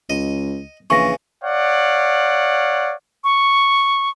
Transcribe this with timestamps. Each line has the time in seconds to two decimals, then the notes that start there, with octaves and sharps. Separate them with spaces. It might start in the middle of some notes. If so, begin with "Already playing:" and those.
0.10 C#2 D#5
0.90 A#1 C#3 E3 C#6 A#6
1.44 C#5 D5 F5 F#5
3.24 C#6